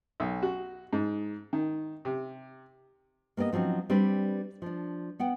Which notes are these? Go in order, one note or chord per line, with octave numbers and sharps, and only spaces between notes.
B1
F#4
G#2
D#3
C3
A#3 B3 G4 D5 D#5
F3 F#3 C4 C#4 D#4
G3 C4 D4 B4
F3 D4
B3 F#5 G5